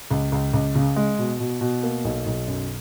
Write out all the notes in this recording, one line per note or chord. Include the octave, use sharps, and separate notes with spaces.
C#2
C#2
C#2
C#3
G#3
B2
B2
B2
A#3
B1
B1
F#2